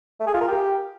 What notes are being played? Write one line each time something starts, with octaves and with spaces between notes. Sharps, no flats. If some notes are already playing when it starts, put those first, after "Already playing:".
A3
G#4
F4
A#4
G4